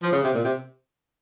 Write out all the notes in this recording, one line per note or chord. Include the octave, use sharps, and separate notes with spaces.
F3
C#3
C3
A#2
C3